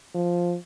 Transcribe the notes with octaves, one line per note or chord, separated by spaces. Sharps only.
F3